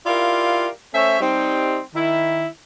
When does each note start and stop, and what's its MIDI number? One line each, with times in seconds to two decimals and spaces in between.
0.06 0.69 64
0.06 0.69 65
0.06 0.69 67
0.06 0.69 70
0.06 0.69 74
0.06 0.69 77
0.94 1.20 57
0.94 1.20 61
0.94 1.20 72
0.94 1.20 73
0.94 1.20 76
1.20 1.79 55
1.20 1.79 60
1.20 1.79 63
1.95 2.47 51
1.95 2.47 64